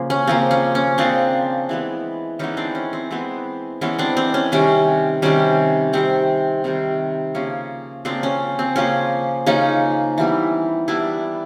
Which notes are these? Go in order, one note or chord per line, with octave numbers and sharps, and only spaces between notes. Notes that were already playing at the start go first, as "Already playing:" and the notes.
Already playing: C#3 F3 A#3
C#4
C#3 F3 A#3 C4
C#4
C#4
C#3 F3 A#3 C4 D4
E3 G#3 B3
E3 G#3 B3 C#4 D#4
C4 D4
C#4
C4
E3 G#3 B3 C4
E3 G#3 B3 C#4
C4 D4
C4
C#4
C3 D#3 G3 C#4
C3 D#3 G3 C#4
C3 D#3 G3 C4
C3 D#3 G3
C#3 F3 A#3 C#4
C#3 F3 A#3 C4 D4
C#4
C4
C#3 F3 A#3 C#4
C#3 F3 A#3 C#4 D#4
E3 G3 B3
E3 G3 B3 D4 E4